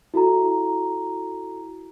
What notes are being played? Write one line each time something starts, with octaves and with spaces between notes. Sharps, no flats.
E4 F#4 A4 A#5